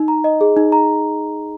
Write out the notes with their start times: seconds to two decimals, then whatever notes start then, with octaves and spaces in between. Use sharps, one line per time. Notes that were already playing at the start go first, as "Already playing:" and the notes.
Already playing: D#4
0.08 A#5
0.24 D#5
0.41 G#4
0.57 D#4
0.72 A#5